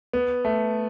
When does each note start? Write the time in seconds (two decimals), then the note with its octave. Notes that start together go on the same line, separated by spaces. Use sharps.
0.13 B3
0.45 A3